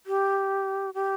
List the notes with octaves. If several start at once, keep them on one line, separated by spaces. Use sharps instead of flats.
G4
G4